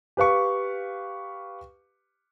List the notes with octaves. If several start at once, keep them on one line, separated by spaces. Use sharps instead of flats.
G4 B4 F5 C#6